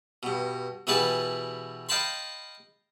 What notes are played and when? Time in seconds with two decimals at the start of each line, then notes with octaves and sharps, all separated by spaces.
0.23 G2 B2
0.87 B2 E3 G3 G#4 B4 A5
1.89 D#5 F5 G5 A5 B5 C6